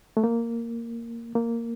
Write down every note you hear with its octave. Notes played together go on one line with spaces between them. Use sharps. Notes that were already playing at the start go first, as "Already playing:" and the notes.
A3
A#3
A#3